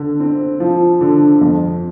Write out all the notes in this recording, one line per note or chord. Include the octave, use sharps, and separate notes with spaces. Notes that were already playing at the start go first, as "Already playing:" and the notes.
Already playing: D3
C4
F3
D3
F2